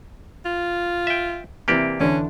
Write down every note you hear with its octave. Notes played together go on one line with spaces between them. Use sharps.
F4
E5 G5
C3 E3 A#3 C4 G4 D5
E2 D3 C#4 D4